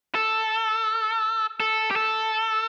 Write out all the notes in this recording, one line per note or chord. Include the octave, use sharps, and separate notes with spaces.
A4
A4
G4
A4